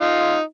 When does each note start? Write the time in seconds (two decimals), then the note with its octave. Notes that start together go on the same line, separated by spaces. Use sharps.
0.01 D#4 F4